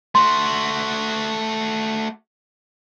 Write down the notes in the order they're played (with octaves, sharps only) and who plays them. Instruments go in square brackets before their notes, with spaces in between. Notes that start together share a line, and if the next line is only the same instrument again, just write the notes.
[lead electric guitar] A3 F#4 [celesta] C6